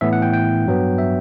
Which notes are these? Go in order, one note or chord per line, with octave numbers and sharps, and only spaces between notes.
A2 E3 B3 E5
F#5
G5
G5
G2 F#3 B3
E5